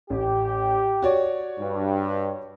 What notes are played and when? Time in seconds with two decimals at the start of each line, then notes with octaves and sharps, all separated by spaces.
0.10 A1 G4
1.02 F#4 C#5 D5
1.60 G2